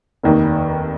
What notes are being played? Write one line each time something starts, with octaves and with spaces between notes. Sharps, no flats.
F1 D#2 D#3